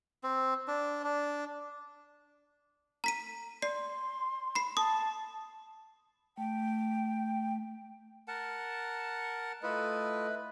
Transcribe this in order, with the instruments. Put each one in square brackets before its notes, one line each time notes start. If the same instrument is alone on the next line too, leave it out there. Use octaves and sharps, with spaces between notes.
[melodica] C4
D4
D4
[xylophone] A#5 B6 D#7
[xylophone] D5 C7 [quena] C6
[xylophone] B5 C7
[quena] A5 [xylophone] D#6
[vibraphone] A3 [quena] G5
[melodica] A#4 F#5 A5
[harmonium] A3 D#5 [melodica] E4 F4 [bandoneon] B4